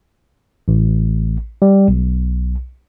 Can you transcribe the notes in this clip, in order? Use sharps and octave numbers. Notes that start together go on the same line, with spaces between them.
A1
G3
B1